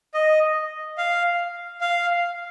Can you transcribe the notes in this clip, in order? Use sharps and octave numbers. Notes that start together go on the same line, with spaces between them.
D#5
F5
F5